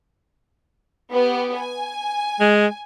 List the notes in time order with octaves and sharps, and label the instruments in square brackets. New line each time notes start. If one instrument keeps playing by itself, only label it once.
[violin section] B3 G4
G#5
[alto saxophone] G#3